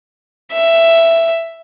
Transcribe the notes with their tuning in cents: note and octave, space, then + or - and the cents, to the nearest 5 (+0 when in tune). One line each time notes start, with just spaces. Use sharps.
E5 +10